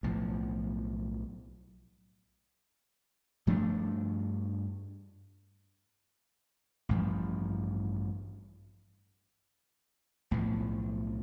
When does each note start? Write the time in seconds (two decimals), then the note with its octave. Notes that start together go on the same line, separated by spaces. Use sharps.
0.03 B1 A2 F3
3.47 G2 F3 A3 D4
6.89 A1 G2 F3
10.31 B1 A2 F3